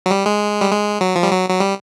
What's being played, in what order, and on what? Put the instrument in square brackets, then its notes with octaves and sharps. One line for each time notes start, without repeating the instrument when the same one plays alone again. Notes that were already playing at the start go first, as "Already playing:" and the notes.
[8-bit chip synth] F#3
G3
G#3
G3
G#3
F#3
F3
G3
F#3
F#3
G3